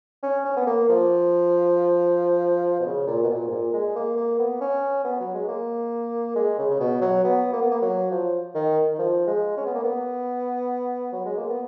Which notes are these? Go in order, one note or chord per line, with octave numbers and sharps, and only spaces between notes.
C#4
C#4
B3
A#3
F3
B2
C#3
A#2
B2
A#2
G#2
A#2
G#3
A#3
A#3
B3
C#4
B3
F#3
G#3
A#3
G#3
C#3
C#3
B2
F#3
B3
A#3
B3
A#3
F#3
F3
D#3
D#3
F3
G#3
C#4
B3
A#3
B3
F#3
G#3
A#3
B3